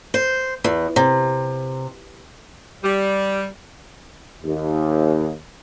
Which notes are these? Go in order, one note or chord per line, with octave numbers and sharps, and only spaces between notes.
C5
E2
C3
G3
D#2